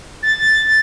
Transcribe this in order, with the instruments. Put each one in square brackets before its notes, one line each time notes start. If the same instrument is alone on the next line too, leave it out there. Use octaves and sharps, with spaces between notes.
[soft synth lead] A6